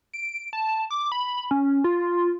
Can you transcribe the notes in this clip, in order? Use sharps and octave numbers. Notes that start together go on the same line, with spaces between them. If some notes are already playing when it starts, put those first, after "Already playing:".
D7
A5
D6
B5
C#4
F4